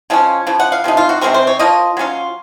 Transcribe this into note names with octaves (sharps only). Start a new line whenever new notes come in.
C#3 F3 G#3 C#4
C#3 F3
F#5
F5
C3 F3 D#4
F4
F#4
C3 F3 G#3 C4 A#4
C5
C#5
F3 A#3 F4 D#5
F#3 C#4 F4